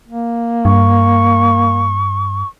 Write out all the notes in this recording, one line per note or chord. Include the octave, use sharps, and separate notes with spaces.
A#3
G2 C#6